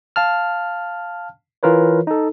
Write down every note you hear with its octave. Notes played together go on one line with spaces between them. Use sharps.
F5 A5 F6
E3 F4 A#4 B4 C#5
D#4 A4